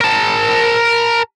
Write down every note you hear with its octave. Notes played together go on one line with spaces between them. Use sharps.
A#4 A5